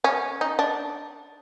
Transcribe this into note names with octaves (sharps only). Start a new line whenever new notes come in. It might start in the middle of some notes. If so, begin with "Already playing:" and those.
C#4
D#4
D4